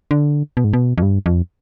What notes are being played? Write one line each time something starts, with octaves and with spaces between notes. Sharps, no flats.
D3
B2
G#2
B2
F2
G2
F2